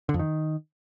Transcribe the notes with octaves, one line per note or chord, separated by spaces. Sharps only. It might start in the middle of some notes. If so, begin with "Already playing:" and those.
D3
F2
D#3